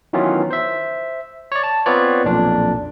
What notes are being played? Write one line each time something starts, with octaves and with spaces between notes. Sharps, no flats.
D#3 E3 F#3 B3 C#4 F4
C5 E5
C#5 D5
A5
B3 C4 F4 B4 C#5 D5
B1 F2 A#2 D4